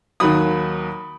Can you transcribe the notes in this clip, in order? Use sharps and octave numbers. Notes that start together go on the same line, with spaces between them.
D#2 D#3 F#3 B5 D#6